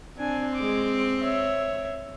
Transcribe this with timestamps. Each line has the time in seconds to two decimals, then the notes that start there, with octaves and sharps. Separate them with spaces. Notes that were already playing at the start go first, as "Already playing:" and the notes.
0.18 C4 D4 G#5
0.55 G#3 D6
1.21 C#5 E5